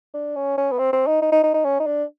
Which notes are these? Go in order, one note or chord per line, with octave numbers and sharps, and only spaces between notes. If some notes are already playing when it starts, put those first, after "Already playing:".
D4
C#4
C#4
B3
C4
C4
D#4
D#4
D#4
D#4
D#4
C#4
D#4
D4